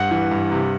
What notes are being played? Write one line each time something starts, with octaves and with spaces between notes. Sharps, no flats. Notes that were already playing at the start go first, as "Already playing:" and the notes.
Already playing: G2 F#5
E3
G2
C3